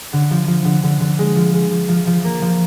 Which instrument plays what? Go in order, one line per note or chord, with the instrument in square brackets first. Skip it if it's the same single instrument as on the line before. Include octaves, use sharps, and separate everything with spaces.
[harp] D3
F3
F3
D3
D3
D3
G#3
F3
G#3
F3
F3
F3
A#3
F3